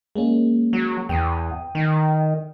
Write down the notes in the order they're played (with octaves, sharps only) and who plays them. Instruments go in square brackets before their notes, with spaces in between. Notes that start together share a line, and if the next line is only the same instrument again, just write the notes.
[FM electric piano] G#3 A#3 C#4
[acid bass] F#3
[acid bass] E2 [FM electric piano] G5 D#6
[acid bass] D#3